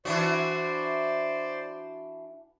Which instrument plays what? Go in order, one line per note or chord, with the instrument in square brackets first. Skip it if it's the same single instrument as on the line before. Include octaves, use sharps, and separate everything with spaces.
[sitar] E3 D4 F#4 [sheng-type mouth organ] C5 D5